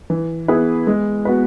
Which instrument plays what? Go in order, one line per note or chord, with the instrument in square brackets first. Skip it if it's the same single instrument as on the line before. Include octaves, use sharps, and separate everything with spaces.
[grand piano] E3
B3 E4 G#4 B4
G#3
B3 F#4 B4